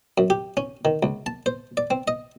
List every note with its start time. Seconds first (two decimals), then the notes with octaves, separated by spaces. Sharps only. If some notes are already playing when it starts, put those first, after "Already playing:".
0.18 F#2
0.30 G4
0.57 C#4
0.85 D#3
1.03 C#2
1.26 A5
1.46 C5
1.77 D5
1.90 C4
2.08 D#5